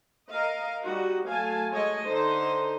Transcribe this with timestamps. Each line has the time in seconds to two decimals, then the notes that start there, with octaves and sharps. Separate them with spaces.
0.29 A#4 D#5 F5
0.83 G3 D#4 F#4
1.28 F#3 A3 F5 G#5 A5
1.71 G#3 A4 C#5 D#5
2.07 D3 D#4 C5